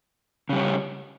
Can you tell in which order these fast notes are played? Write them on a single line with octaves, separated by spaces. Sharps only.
C#3 G3 C#4